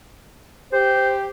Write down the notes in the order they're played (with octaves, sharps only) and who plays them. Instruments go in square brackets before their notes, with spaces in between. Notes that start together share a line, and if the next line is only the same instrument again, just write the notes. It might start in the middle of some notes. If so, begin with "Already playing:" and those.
[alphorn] G4 [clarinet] C5